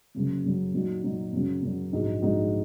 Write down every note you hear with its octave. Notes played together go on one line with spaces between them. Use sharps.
F#1 F#2 C#3 F#3
F#1 F#2 C#3 F#3
A#2 F#3 D#4 F#4
A#2 F#3 D#4 F#4
F#2 C#3 F#3
F#2 C#3 F#3
A#1 G#2 G#3 D#4 F#4
A#1 G#2 G#3 D#4 F#4